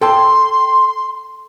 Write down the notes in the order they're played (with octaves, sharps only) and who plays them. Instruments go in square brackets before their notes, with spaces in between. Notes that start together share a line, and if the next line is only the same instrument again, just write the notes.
[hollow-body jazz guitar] A4 G5 A5 [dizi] C6